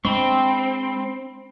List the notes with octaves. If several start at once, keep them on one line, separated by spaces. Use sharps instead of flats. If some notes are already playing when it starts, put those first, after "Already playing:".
G#3 C4 D4 G5 B5 C#6